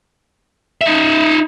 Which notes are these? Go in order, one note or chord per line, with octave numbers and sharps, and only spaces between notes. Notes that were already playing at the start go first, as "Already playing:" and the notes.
D#4 E5